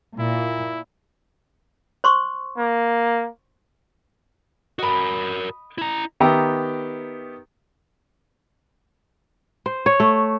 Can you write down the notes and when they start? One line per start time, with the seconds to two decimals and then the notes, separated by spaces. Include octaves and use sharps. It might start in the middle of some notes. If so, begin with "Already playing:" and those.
0.19 A#2 E4
2.04 C5 C6 C#6
2.57 A#3
4.79 F#4 A#4 D#5 B5
5.78 E4 A#5
6.20 D#3 B3 G4 E5 G5 A#5
9.66 C5
9.86 C#5
10.00 A3